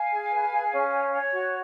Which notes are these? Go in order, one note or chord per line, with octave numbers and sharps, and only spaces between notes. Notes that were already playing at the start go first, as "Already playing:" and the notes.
Already playing: F5 G#5
G#4
B4
G#4
C#4
C#5
C#5
F#4